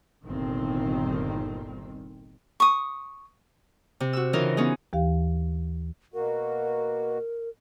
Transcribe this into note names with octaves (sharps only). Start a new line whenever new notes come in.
G1 C2 A#2 D#3 G3 C4
C#6 D#6
C3
F#4 E6
C#3 E3 C#4 D#4 F4 A#4
B3 C#4 D#4 G#4
D#2 E3 G4 F5
B2 A#3 F#4 A#4